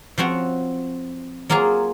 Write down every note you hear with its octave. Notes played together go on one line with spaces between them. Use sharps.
F3 C4 F#4 C#5
F#3 A#3 F4 G#4